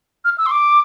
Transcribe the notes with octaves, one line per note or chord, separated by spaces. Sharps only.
F6
E6
C6
D6